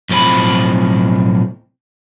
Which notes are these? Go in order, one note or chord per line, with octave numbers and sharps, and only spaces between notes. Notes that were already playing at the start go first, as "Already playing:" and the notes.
B1 A2 F3 C4 B5